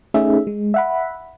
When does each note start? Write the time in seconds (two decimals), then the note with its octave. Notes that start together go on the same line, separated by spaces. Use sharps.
0.14 A3 C#4 D#4 G#4 E5
0.47 G#3
0.74 E5 F#5 B5